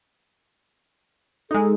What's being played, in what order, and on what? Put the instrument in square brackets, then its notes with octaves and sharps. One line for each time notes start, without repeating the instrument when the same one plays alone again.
[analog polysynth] G#3 D#4 [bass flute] A4